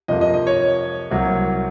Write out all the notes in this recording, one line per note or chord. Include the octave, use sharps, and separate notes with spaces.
F2 C3 F3 A#3 D#5
D#5
D#5
C#5
C2 C3 F#3 A#3